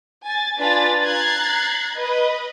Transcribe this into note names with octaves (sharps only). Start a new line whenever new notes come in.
G#5 A6
D4 F4 B4 G#5 A6
A#5 F#6 G#6 A6 C7
B4 D#5